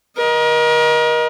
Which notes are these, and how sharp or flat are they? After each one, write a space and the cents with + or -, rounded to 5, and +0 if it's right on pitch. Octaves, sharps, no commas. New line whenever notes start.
A#4 +35 D#5 +0